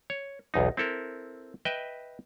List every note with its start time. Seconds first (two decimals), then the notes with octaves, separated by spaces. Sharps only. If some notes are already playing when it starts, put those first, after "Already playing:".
0.10 C#5
0.54 B1 E2 D#4
0.77 C4 E4 A4 A#4
1.65 B4 D#5 E5 G5